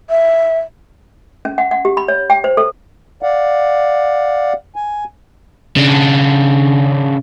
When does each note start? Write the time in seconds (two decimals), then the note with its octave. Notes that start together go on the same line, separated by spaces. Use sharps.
0.10 E5
1.45 C#4
1.58 F#5
1.71 F#5
1.85 G4
1.97 B5
2.08 C#5
2.30 G5
2.44 C5
2.57 A4
3.22 D5 F5 F#5
4.76 G#5
5.76 C#3 D4